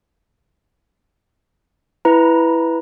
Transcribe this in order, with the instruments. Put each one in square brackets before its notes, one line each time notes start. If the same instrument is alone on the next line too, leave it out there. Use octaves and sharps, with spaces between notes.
[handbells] E4 B4 A#5